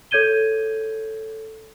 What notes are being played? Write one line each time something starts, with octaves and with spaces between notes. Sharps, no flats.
A4 C#5 G6 G#6 D#7 G7